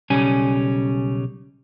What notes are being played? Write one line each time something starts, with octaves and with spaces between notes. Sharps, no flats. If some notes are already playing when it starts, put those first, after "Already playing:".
B1 C#3 G3 C#4 G#5